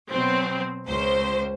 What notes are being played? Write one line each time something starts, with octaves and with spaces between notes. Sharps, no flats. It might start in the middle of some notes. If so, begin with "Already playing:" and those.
B2 F#3 C4
C#2 C5